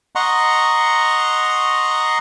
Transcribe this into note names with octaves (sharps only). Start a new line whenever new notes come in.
D#5 F#5 A#5 C6 C#6